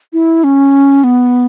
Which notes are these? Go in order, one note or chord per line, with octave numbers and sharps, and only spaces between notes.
E4
C#4
B3